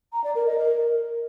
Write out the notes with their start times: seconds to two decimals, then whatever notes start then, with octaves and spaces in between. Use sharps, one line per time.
0.12 A#5
0.24 D5
0.35 A#4
0.47 D#5
0.58 A#4